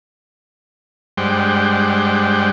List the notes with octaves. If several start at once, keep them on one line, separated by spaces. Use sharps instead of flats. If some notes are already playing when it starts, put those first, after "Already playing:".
G2 G3 G#3 C5 F#5 G5